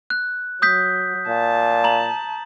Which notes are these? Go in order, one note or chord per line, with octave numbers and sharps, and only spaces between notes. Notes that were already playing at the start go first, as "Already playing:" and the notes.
F#6
F#3 D#6 G6 B6
A#2 A5
A#5 F#7